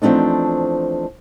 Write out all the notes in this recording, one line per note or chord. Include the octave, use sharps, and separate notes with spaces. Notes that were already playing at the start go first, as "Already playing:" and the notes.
E2 F3 A3 C4 D4 D#4